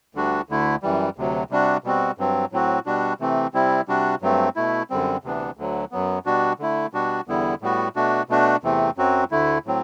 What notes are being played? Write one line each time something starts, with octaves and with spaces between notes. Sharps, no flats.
D2 D3 G3 D4 F#4
D2 D3 A3 E4
F#2 E3 G3
D2 C3 F#3
C3 G3 D4 F#4
B2 G3 C4 F#4
G2 F#3 C4
A2 F#3 C4 F#4
B2 G3 D4 F#4
C3 E3 A3 C4
C3 G3 C4 E4
C3 G3 D4 F#4
G2 F#3 A3 C4
B2 A3 E4
F#2 D3 G3 C4
D2 C3 E3 B3 D4
D2 D3 F#3
F#2 F#3 B3
B2 G3 D4 F#4
D3 A3 E4
B2 G3 D4 F#4
E2 D3 G3 B3 E4
A2 G3 B3 F#4
B2 A3 D4 F#4
B2 A3 D4 F#4
E2 C3 E3 A3 C4
F#2 F#3 C4 F#4
D2 D3 A3 E4
A2 F#3 C4